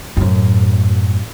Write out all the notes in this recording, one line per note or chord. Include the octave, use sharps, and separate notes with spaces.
F#2 A2